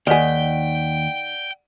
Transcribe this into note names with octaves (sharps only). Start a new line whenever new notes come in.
D#2 D#3 G#4 D5 F#5 G5 B6